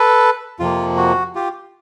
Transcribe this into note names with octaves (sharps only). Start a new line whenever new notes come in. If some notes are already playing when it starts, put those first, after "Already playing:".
Already playing: A4 B4
F2 C3 F3 A#3 F4
F#4
F4 G4